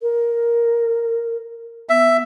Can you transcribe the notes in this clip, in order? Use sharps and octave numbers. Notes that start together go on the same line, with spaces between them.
A#4
B3 E5